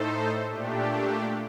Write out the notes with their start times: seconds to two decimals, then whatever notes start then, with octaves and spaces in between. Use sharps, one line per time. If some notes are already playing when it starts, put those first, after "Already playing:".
Already playing: A2 A3 D#4 A4 C5
0.48 A#2 A3 D4 G4